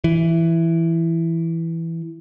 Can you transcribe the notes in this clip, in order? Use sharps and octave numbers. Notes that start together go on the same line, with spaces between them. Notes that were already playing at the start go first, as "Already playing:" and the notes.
E3